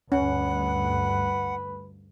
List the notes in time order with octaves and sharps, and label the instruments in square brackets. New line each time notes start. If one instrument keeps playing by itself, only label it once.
[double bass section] D2 G2 [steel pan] C#4 [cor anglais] B4 [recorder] F#5